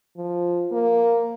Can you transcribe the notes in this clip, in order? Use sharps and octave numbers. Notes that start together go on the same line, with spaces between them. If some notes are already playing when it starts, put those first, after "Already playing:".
F3
A#3